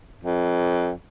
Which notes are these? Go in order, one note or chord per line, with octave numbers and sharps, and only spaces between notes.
F2